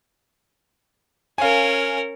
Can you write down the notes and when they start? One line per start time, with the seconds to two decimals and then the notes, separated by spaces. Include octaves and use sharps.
1.38 C#4 A#4 F5 G#5